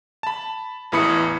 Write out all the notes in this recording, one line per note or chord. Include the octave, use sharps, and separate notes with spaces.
A5 B5
A1 E2 E3 B5 D#6 C#7